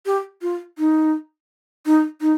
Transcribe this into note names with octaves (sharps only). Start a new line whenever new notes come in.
G4
F4
D#4
D#4
D#4